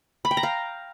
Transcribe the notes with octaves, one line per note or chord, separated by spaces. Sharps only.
B5
G5
A#5
F5